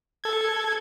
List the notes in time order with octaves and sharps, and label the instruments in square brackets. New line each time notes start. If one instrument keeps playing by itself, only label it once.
[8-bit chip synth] A4 G#6